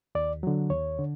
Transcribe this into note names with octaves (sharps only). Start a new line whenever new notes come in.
D#2 D5
D3 F#3
D#2 C#5
D3